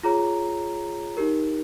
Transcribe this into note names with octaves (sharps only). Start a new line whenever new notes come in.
F4 G#4 C#5 A#5
D#4 G4 A#4